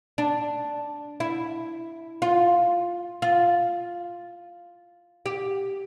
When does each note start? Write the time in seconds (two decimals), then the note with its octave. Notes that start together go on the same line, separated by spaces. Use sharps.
0.18 D4
1.20 E4
2.22 F4
3.22 F4
5.26 G4